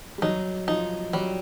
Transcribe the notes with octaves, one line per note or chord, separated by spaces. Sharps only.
G3
F#3 D#4
F3 D#4
F#3 G3